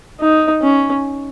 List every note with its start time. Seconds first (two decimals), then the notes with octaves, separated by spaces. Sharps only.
0.20 D#4
0.62 C#4